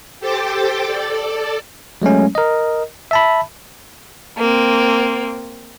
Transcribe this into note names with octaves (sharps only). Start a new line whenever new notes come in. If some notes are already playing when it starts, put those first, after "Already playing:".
G4 A4 C5 G5 A5 D6
A4 D5
F#3 G#3 A3 C#4
A#4 D#5
E5 A5 B5
A#3 C4